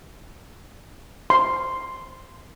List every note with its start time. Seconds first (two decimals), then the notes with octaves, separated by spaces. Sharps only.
1.30 C6